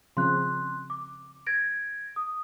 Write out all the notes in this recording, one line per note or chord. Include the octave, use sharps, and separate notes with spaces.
C#3 F3 C4 C6 F#6
D6
G#6 A#6 D7
D#6